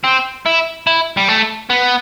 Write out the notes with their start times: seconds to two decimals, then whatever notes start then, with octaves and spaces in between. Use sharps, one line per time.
0.04 C4
0.46 E4
0.87 E4
1.17 G3
1.28 A3
1.70 B3